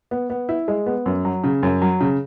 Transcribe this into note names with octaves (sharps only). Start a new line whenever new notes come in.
B3
B3
E4
G#3
B3
F#2
F#3
C#3
F#2
F#3
C#3